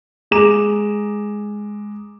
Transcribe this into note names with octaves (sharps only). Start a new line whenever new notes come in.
G#3 G#4 A#5 D6 E7